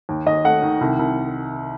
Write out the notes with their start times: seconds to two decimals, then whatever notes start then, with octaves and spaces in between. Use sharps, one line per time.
0.09 D#2
0.26 D#2 D#5
0.44 A3 F#5
0.62 D#3
0.81 C2
0.99 C2